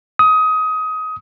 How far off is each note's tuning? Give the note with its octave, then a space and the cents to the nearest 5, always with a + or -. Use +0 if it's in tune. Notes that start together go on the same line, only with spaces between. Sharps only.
D#6 +20